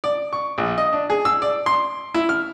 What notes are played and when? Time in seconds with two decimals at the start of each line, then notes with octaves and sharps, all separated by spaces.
0.04 D5
0.33 C#6
0.58 A#1
0.78 D#5
0.93 D4
1.10 G#4
1.25 E6
1.42 D5
1.66 C6
2.14 E4
2.29 F6